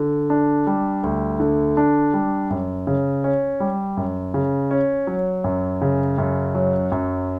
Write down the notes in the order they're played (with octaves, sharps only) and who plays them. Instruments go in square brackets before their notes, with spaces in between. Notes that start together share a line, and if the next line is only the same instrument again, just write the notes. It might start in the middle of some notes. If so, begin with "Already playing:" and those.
Already playing: [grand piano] D3
D4
G3
D2
D3
D4
G3
F#2
C#3
C#4
G3
F#2
C#3
C#4
F#3
F#2
C#3
F#2
F#3
F#2